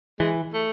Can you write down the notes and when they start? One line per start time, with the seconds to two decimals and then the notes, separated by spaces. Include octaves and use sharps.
0.20 E3 G#3
0.54 A3